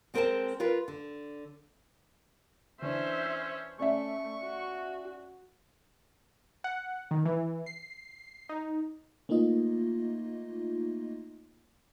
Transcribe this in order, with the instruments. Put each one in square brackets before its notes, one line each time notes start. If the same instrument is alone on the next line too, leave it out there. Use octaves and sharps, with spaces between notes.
[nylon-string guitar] G#3 C4 A#4 C5 G5 A5
F4 A#4 B4
D3
[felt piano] E3 D4 [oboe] C#4 [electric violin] C5 E5
[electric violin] A3 [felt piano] C#4 D5 E5 [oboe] C#6
[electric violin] F#4
[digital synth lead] F#5
D#3
E3
C7
D#4
[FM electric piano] A3 A#3 D#4 F4 D#5